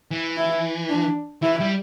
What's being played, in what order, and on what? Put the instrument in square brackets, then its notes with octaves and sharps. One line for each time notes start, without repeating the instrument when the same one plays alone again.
[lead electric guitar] E3
[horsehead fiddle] E4
D4
[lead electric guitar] E3 [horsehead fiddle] E4
[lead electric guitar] G3